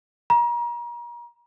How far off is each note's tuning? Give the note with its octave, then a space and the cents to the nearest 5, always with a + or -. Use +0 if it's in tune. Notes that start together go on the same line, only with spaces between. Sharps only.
A#5 +35